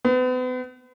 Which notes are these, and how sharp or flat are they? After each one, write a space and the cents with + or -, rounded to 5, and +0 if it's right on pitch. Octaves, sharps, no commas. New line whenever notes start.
B3 +40